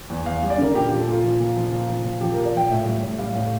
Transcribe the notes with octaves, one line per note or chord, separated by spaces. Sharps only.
E2
E2 F5
G3
D5
D3 A#4
A#2 G4
F3
A4
A#2 F4
F3
A#2
F3
A#2 F4
F3
A#2
F3 G4
A#2 A#4
D5
F3 G5
A2 E5
G3
A2
G3 F5
A2